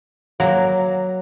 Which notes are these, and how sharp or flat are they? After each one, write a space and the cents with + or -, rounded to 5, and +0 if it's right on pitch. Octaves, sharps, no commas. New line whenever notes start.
F#3 +0 A#3 -5